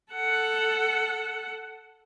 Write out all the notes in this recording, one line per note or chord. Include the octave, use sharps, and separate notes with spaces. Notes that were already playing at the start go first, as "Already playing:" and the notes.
A4 F#5